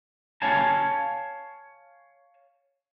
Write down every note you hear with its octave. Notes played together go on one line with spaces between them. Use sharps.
C#5 F5 G#5 A5